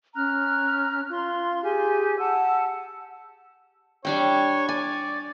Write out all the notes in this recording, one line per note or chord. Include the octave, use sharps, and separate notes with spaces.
C#4 A#5 F6 F#6
F4 C6
G4 G#4 G#5
F#5 A5 E6
G3 D4 C#5 G5
D5 G#5